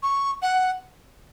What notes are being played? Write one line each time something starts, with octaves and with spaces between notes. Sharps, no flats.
C#6
F#5